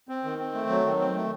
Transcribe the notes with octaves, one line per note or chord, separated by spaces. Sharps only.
C4
D#3
C4
A3
F#3
D#3
C4
A3